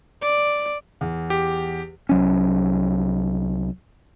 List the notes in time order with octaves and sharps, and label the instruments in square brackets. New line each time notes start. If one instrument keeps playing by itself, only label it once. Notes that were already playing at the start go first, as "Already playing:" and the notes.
[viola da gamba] D5
[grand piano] E2
[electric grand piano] G4
[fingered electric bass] C2 F#3 C#4